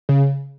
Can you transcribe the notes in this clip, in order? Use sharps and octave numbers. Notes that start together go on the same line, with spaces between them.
C#3